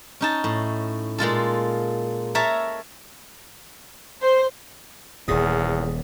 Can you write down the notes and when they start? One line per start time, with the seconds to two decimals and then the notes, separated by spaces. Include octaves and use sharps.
0.21 C#4 D#4 A5
0.44 A2
1.18 A#2 G#3 F4 A4
2.35 A4 A#4 C#5 E5 A5 A#5
4.21 C5
5.28 D#1 E2 A#2 G#4